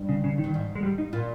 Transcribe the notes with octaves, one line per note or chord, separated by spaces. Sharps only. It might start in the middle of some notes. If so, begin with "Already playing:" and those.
Already playing: G2
C#3
C#3
D#3
G2
G#2
G#3
G3
D#4
A#2 F4